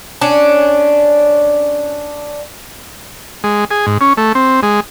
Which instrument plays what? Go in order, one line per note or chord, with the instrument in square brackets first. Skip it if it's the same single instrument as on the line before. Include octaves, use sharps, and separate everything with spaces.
[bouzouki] C#4 D4
[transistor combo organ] G#3
G#4
G#2
C#4
A3
C4
G#3